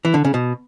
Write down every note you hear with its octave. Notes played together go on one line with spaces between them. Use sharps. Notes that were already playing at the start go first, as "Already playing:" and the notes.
E3
D3
C#3
B2